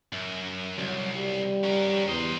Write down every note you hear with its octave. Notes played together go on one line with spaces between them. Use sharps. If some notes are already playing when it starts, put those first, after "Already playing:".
F#2
C2 F#3
G3
C#4 A#4
E2 C5 D#5